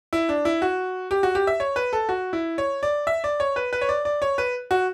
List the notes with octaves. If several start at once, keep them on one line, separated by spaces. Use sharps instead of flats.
E4
D4
E4
F#4
G4
F#4
G4
E5
C#5
B4
A4
F#4
E4
C#5
D5
E5
D5
C#5
B4
B4
C#5
D5
D5
C#5
B4
F#4